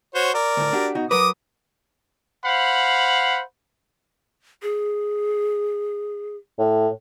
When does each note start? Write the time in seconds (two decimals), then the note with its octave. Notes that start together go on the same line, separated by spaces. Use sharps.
0.15 F#4 C5 C#5
0.34 A#4 D5
0.57 D2 A2
0.73 D4 F#4 G4
0.95 B2 D#4 F#4
1.11 F#3 A#4 B4 D6 D#6
2.45 C5 F5 F#5 B5
4.62 G#4
6.59 A2